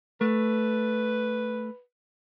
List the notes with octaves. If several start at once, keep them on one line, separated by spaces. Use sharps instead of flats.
A3 B4